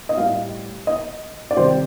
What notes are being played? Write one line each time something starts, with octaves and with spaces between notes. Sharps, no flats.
D#5
A2 G3 F5
D#5
D5
C3 D#3 G3 C5